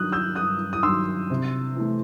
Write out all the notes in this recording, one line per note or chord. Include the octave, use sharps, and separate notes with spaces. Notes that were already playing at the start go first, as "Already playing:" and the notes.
Already playing: G2 D#3 F#3 D#6 F#6 G6
E6 G6
G2 D#6 F#6
D#6
D#3 F#3 C6 E6
C3
E3 A3